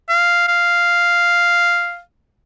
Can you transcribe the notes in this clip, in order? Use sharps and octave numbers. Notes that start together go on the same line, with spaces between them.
F5
F5